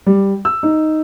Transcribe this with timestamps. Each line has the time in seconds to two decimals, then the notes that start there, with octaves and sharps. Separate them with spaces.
0.06 G3
0.45 E6
0.63 D#4